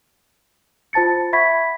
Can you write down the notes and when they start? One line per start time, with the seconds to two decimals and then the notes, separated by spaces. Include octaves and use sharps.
0.93 F4 C5 A5 A6 C#7
1.33 E5 F#5 B5 C#6 G#6 B6